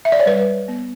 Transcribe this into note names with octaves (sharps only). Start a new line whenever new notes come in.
E5
D5
C#5
G3 B4
B3